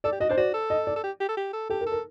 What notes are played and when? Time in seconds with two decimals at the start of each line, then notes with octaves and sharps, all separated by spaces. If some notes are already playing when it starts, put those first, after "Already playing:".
0.04 A4 D5
0.12 G4
0.20 F#4 D#5
0.29 D4 C5
0.37 F#4 D5
0.54 A4
0.70 D#5
0.87 D5
0.96 A4
1.04 G4
1.20 G4
1.29 A4
1.37 G4
1.53 A4
1.70 G4 A4
1.81 A#4
1.86 A4
1.92 A#4